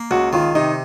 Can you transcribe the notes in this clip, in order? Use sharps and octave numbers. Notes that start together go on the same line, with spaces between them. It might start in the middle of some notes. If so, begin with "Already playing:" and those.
Already playing: A#3
C#2 F#4
D#3 F4
C3 D#4